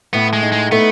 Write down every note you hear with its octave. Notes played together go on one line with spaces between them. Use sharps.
A2 B3
G#3
D#4
G#3
A3 B3